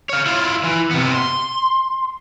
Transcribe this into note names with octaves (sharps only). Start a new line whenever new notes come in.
C#5 F5
E4 F4
E3
C3 B3
C6